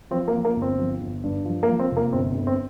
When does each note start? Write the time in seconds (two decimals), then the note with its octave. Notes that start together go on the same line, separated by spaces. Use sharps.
0.11 F3 C4
0.28 A#3
0.34 F3
0.45 A#3
0.56 G1
0.62 C4
0.78 F3
1.01 G1
1.23 G2
1.45 F3
1.63 A#3
1.68 F3
1.79 C4
1.91 F1
1.97 A#3
2.13 G1 C4
2.35 G1
2.47 C4